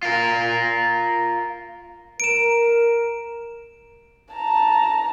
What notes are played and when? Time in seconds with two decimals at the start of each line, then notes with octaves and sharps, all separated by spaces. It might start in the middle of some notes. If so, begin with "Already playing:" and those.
0.03 F4 A#4
2.20 A#4 D7 E7
4.34 A5 A#5